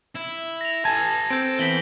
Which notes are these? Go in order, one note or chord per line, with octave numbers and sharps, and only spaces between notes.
E4
A#6 F7
A4 G#5 A5 G#6
C4 G6 D7
E3 B3 B6 F#7 G7